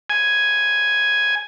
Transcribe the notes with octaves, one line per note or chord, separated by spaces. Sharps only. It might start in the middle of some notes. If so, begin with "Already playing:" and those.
G#5